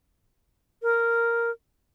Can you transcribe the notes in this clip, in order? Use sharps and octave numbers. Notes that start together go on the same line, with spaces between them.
A#4